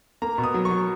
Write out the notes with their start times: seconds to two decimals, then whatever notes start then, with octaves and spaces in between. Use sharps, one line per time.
0.22 A#3 A#5
0.38 B2
0.44 D#6
0.54 F#3
0.65 C#6
0.71 F#3